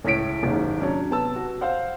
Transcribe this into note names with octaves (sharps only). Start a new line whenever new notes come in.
C#2 A2 C#5 B6 D7
F#1 D#2 G#2
F#3 C#4 D4
C3 B3 A5 E6
F#4
C5 F5 F#5